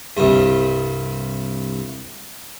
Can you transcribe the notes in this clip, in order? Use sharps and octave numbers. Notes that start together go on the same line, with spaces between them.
C2 G2